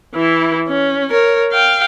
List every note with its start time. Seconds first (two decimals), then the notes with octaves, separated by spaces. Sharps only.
0.15 E3 E4
0.68 C#4
1.10 A#4 C#5
1.52 F5 G5